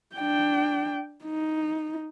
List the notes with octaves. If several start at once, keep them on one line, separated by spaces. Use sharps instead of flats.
D4 G5
D#4